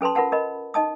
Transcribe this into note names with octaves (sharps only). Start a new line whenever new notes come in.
C#4 A4 B4 A5 C6
F4 A#4 B4 F#5 A5
A#4 D#5 B5
D#4 D#5 A5 D#6